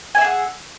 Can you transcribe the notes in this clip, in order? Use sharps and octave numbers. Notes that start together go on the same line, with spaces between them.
G#4 E5 F#5 G#5